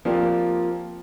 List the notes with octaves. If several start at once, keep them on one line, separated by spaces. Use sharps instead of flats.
F3 A#3 C4 F4 G4 D5